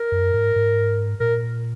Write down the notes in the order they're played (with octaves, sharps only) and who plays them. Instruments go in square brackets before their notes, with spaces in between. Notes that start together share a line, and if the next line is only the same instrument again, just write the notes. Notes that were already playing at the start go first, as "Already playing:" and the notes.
Already playing: [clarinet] A#4
[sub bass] F#2
G#2
G#2
[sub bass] A#2 [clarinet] A#4